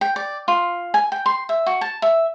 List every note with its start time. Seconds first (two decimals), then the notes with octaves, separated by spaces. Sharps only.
0.01 G5
0.16 D5
0.48 F4
0.94 G#5
1.12 G5
1.26 C6
1.49 E5
1.66 F#4
1.81 A5
2.02 E5